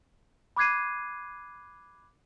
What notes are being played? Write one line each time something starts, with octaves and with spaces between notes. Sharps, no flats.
B5 D6 F#6 G#6 C7 D#7